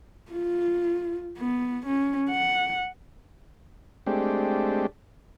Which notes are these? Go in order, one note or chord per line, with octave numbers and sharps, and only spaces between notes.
F4
B3
C#4
F#5
G#3 A3 C4 D4 G4